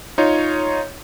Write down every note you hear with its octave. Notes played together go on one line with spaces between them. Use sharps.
D#4 F4 C#5